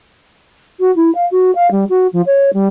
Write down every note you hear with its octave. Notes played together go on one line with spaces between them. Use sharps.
F#4
E4
F5
F#4
F5
G3
F#4
F3
C#5
G3